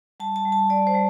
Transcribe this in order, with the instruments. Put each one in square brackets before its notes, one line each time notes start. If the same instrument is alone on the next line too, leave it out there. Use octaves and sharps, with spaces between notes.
[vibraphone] G3 A5
A5
G3
A5
G3 D5
C5
G3